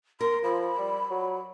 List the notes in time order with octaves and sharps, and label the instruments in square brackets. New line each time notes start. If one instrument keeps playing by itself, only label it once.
[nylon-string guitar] A#4 [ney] C6
[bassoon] F3 [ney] B5
[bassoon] G3
F#3